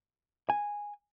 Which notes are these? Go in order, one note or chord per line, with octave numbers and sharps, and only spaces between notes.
G#5